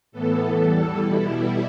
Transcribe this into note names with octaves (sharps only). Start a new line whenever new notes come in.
A2 E3 B3 A4
E2 E3 G3 A4
B2 G3 E4